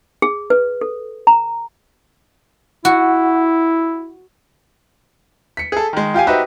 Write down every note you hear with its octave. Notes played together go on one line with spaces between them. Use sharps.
G#4
B4
A4
A#5
E4 F#4
B6 C#7
G#4 A4
D#3 G#3
F4 G4 F5 G#5
D#4 F#4 G4 B4 C5 E5